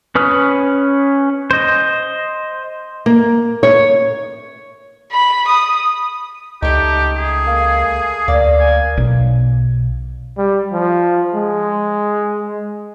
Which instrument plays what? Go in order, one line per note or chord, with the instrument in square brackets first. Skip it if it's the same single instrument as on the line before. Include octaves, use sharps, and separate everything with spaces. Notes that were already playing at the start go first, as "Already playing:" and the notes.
[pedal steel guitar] C#4 B4 D#6 F6
C5 D#5
[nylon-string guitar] A#3
C#5
[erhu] B5
D#6
[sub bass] C#2 [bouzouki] A3 G5 [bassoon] D#4 [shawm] G4
[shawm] G#4
[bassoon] A#3
[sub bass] D2 [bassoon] A#3 [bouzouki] D5
[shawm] G#5
[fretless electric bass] B1
[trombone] G3
F3
G#3